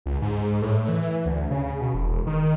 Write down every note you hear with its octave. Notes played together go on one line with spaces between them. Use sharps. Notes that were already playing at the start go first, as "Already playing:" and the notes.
C#2
G#2
A2
E3
D2
C#3
B2
E1
D#3